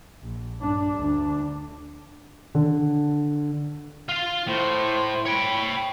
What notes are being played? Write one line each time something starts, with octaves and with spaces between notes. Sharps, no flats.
A#1
G2 D4
D2 D4
D3
F4 F5
A2 C5
C#5 G5 B5